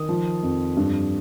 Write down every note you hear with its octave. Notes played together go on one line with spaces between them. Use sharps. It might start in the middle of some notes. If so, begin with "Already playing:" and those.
Already playing: D#3 D#6
F3
F2
G2